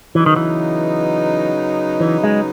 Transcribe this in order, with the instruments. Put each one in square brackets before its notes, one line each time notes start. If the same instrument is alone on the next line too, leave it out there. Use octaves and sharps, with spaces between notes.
[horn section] C#3 F#3 B3 D#4 [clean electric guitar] E3
[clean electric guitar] D#3
E3
E3
G#3